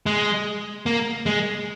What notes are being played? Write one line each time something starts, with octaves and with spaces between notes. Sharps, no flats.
G#3
A#3
G#3